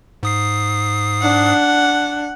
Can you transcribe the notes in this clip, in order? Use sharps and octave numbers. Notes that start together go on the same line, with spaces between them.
G#2 D#6 C7
D4 F#5